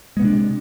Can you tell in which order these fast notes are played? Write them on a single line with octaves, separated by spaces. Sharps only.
G#3 B3 C3 D4